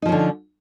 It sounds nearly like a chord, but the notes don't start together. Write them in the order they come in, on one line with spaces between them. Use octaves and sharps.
D#4 F3 C#4 D3